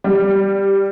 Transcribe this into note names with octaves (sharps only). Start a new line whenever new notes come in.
G3